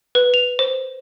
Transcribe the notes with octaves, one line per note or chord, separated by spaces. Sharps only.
B4
F7
C5